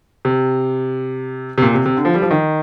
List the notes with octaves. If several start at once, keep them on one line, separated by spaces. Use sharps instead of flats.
C3
C3
A#2
C3
C3
D3
F3
G3
F3
D#3